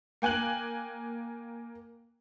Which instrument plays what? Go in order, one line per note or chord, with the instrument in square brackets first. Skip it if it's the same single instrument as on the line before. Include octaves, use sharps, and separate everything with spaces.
[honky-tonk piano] A#3 G5 G#5 F#6 F#7